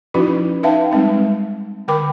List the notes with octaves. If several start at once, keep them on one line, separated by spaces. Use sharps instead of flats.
F3 C#4 D#4 E4 F#4 B4
D#4 B4 E5 F5 G5 A5
G3 G#3 C4 D#4
D3 A#4 G5 B5 D6